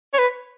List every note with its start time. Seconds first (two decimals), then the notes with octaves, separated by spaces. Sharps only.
0.14 C#5
0.18 B4